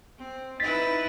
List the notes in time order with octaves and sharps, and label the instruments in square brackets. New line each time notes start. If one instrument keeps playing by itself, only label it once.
[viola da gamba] C4
[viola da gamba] D#4 E4 B4 [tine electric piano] A6 B6